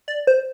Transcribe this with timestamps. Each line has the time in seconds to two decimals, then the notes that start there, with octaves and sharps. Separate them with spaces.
0.08 D5
0.27 C5